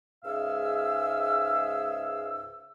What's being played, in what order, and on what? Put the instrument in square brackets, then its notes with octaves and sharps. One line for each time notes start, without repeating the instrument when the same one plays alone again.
[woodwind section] C#2 G#2 G#4 E5 F5 E6